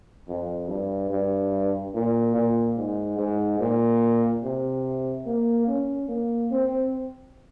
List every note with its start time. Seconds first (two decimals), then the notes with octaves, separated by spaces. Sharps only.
0.28 F2
0.69 G2
1.10 G2
1.94 A#2
2.35 A#2
2.77 G#2
3.18 G#2
3.60 A#2
4.43 C3
5.26 A#3
5.67 C#4
6.08 A#3
6.51 C4